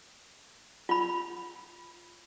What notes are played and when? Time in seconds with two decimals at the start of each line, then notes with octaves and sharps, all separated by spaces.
0.89 F4 B5